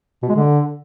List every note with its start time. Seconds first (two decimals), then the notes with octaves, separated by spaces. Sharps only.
0.23 B2
0.29 G#3
0.35 D3